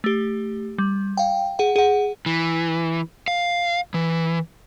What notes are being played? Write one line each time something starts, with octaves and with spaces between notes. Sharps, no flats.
A3 G4
G3
F5 G5
G#4 F#5
G#4 F#5
E3
F5
E3